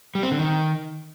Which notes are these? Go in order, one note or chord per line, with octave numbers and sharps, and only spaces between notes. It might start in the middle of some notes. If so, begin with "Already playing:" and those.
G3
C4
D3
D#3